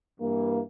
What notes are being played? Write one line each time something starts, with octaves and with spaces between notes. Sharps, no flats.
G2 E3 A#3